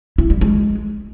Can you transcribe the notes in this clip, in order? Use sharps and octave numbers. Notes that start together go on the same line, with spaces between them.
E4
G3
G#3